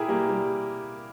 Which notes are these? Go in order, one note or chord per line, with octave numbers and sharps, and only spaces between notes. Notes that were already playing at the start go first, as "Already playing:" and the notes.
Already playing: E4 G4 G#4 A#4
G3 A#3
G3